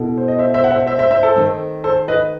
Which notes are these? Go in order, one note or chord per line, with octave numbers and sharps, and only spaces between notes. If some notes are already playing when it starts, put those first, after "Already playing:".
Already playing: B2 E4 A4
C5
D#5
C5 E5
C5 E5
F#5
C5 E5
C5 E5
C5 E5
C5 E5
A4 C5
D#3 A3 C4
A4 C5
B4 D#5